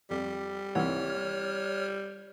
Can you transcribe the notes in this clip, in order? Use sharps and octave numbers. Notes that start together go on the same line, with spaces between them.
F2 G3
C2 E3 C#5 F#5 F6